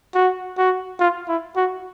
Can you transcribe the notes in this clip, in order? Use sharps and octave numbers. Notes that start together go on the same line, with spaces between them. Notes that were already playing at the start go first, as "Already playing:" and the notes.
F#4
F#4
F4
E4
F#4